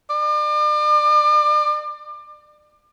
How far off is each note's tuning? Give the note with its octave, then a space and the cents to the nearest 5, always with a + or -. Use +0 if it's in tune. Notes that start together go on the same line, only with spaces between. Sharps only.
D5 +35